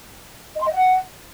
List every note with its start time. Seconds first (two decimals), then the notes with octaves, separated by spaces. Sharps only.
0.56 D#5
0.61 C6
0.67 D#5
0.72 F#5